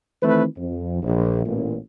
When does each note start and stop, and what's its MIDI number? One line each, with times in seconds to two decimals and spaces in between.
0.22 0.44 51
0.22 0.44 52
0.22 0.44 57
0.22 0.44 60
0.22 0.44 64
0.22 0.44 71
0.56 0.98 41
1.02 1.42 34
1.45 1.75 33
1.45 1.75 46